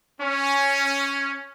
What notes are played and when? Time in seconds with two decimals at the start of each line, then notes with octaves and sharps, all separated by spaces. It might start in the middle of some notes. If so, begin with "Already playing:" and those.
0.21 C#4